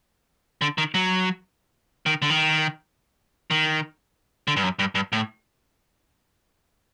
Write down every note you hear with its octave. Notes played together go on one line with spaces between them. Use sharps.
D3
D#3
F#3
D#3
D3
D#3
D#3
D3
G2
F#2
G2
G2
A2